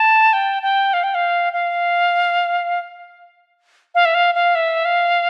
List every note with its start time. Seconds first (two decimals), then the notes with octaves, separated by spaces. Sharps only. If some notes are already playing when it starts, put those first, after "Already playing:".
Already playing: A5
0.33 G5
0.63 G5
0.93 F5
1.04 G5
1.15 F5
1.53 F5
3.95 F5
4.05 E5
4.14 F5
4.35 F5
4.55 E5
4.85 F5